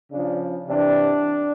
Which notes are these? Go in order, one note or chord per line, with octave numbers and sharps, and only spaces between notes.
C#3 F3 D4
C3 E3 D4